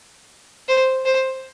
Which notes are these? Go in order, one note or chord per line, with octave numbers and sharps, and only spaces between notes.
C5
C5